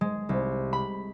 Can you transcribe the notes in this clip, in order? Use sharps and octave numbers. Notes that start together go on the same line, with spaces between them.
G#3
C2
B5